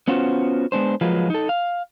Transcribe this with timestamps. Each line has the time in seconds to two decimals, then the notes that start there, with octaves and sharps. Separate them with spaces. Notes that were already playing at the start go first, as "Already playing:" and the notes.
0.08 B3 C#4 F4 F#4 C5
0.72 G#3 B3 D4 C5
1.01 F3 F#3 G#3 A#3 F4 B4
1.30 D#4 A4
1.49 F5